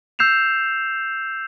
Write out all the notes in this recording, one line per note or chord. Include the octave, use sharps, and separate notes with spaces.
E6 G6 C7 E7 F7